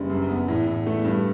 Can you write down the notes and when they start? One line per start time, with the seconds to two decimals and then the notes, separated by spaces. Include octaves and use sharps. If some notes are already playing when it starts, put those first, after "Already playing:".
Already playing: F#1 G2
0.10 F#2
0.29 B3
0.48 E2 A2
0.67 A2
0.86 A3
1.05 G2